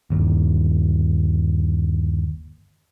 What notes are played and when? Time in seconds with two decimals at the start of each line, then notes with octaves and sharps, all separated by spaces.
0.10 G1 D#2